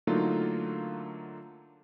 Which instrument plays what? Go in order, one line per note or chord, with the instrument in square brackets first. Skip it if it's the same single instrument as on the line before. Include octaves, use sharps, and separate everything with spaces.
[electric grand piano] D3 F#3 A3 A#3 D#4 F4